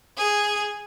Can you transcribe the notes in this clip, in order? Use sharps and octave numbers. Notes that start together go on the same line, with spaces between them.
G#4